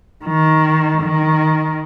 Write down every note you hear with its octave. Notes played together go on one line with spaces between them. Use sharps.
D#3
D#3